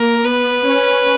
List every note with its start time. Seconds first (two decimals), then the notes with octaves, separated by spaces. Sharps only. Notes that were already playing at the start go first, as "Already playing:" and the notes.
Already playing: A#3 A#4
0.24 B3 B4
0.67 C#4